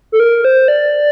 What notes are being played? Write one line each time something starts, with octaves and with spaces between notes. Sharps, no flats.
A4
A#4
C5
D5